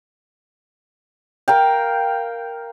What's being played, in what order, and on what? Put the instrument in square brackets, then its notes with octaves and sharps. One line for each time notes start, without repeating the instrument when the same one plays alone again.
[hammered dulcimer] A#4 F5 G5